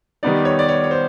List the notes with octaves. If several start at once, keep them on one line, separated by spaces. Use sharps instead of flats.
D#3 G3 B3 D#4 D5
C#5
D5
C#5
C#5
C5